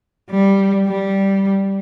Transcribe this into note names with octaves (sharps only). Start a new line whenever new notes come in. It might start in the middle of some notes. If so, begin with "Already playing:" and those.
G3
G3